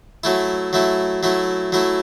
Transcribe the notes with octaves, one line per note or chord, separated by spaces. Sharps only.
F#3 A3 E4
F#3 A3 E4
F#3 A3 E4
F#3 A3 E4